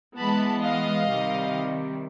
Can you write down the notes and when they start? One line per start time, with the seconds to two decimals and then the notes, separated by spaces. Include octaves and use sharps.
0.18 E3 G#3 B3 A5 B5
0.63 D#5 F5
1.09 C3 D#3 G3